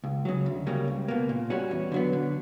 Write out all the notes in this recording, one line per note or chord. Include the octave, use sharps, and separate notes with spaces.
C#2
C#3 F#3
D2
C#3 G3 A#3
C#2
B2 A#3
A#2
G3 C#4 F#4
E2
D3 F#3 B3
D3